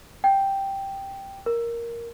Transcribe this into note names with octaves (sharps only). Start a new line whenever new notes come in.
G5
A#4